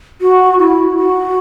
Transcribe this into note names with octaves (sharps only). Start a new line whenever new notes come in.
F#4
E4
F#4